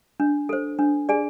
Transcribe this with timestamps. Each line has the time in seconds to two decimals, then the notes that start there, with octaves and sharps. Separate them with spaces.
0.20 D4
0.49 A4 C5
0.79 D4
1.09 G#4 D5 G#5